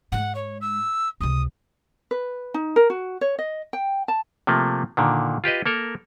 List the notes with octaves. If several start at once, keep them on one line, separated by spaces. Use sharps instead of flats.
G#2 G#3 F#5
C#5
E6
C#2 C3 D#6
B4
D#4
A#4
F#4
C#5
D#5
G5
A5
C3 F3 A3 A#3
A#2 D3 D#3
F4 G4 B4 D#5
A#3 A4 A#4